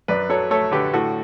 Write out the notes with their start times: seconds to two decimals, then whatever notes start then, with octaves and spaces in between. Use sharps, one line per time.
0.08 F#2 B4 D5
0.29 F#3 A4 C#5
0.50 A3 A4 C#5
0.72 D3 G4 B4
0.93 A2 F#4 A4